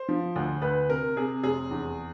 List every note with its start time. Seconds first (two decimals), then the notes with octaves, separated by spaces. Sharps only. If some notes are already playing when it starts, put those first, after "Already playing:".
Already playing: C5
0.09 F3
0.36 D2
0.62 D2 B4
0.89 C3 A#4
1.16 C3 G#4
1.43 F1 G#4
1.71 E2